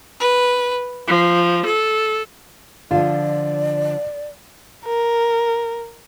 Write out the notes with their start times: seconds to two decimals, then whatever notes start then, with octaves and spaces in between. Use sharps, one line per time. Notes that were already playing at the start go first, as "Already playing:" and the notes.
0.20 B4
1.08 F3
1.66 A4
2.91 D3 F3 F4 D5
4.86 A#4